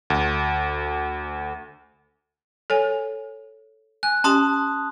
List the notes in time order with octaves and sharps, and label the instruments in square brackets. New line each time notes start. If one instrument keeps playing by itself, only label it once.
[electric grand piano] D2
[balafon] A4 C#5 G#5
[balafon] G#5 [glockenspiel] F#6
[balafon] C#4 G4 [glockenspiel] A5 C6 D#6